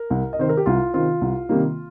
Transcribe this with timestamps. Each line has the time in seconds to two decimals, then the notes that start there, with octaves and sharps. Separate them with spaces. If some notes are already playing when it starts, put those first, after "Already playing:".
Already playing: A#4
0.10 C2
0.33 D#5
0.39 C3 D#3 C4 C5
0.49 A#4
0.57 G4
0.66 C2 F4
0.94 C3 D#3 C4 F4
1.21 C2
1.49 C3 D#3 G3 A#3